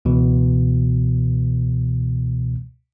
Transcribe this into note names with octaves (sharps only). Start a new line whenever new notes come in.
C#2 B2 E3